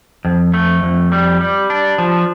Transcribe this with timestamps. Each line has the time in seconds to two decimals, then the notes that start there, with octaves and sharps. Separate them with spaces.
0.25 F2
0.54 A3
0.83 F2
1.12 G3
1.41 G3
1.70 D4
1.98 F3